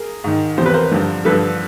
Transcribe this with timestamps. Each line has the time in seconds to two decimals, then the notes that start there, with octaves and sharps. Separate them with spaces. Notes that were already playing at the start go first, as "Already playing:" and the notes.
Already playing: G#4 A#4
0.24 G#2 D#3
0.57 E2 C3 F3 C5
0.66 B4
0.74 A#4 C5
0.91 G2 D3 F3
1.25 G2 D3 F3 A4 B4